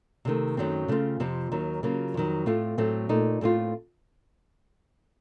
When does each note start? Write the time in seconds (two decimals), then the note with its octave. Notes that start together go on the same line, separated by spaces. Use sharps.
0.25 C3 D#3 A3
0.57 F#2 D#3 F#3 A3 C4
0.88 C#3 A3 C4 F4
1.20 F2 C3 F3 C4
1.52 D#2 D#3 F#3
1.83 C#3 F#3 A#3 F4
2.14 F2 D#3 F#3
2.46 A2 A3 C4 F4
2.78 A2 F#3 A3 C4
3.09 A#2 A3 D#4
3.41 A2 A3 C4 F4